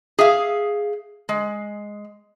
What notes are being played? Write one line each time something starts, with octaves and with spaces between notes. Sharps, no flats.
G#4 E5 F5
G#3